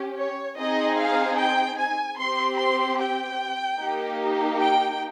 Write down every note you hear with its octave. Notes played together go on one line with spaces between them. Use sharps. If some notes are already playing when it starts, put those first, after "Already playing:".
Already playing: C#4 G4
C#5
C4 D#4 G#4 D#5
F5
G5
G#5
C4 G4 C6
C6
G5
A#3 D#4 G4
G5